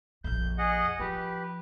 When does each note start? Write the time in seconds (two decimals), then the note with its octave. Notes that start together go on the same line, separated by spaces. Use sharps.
0.24 A#1 F2 G6
0.58 G#4 D#5 F#5
1.00 F3 G4 B4